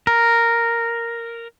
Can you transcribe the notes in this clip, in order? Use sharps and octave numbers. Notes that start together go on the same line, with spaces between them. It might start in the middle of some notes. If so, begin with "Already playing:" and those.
A#4